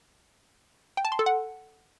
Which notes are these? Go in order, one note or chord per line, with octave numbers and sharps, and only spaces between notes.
G5
A5
C6
A4
F#5